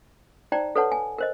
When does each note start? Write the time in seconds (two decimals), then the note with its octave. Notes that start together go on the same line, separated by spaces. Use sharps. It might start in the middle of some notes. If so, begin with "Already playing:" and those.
0.52 D#4 C5 D5 G5 A#5
0.76 A4 B4 C#5 F#5 A5
0.92 G#5
1.18 A#4 C5 D#5